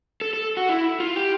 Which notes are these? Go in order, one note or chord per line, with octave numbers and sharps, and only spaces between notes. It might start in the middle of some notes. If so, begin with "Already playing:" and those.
A4
A4
F#4
E4
F4
G4